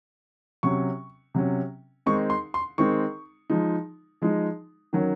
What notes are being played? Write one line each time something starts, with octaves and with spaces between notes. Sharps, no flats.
C3 F#3 C#4 C#6
C3 F#3 C#4
D#3 G#3 C4 D#4 C#6
C6
C6
D#3 G#3 C4 D#4 C#6
F3 G#3 D#4
F3 G#3 D#4
D#3 F#3 C#4